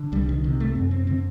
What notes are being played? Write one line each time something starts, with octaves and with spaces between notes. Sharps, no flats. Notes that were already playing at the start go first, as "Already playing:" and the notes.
Already playing: D3
C2 G3
D#3
C3 D#3
A3
F#2 C4
C4
D3 C4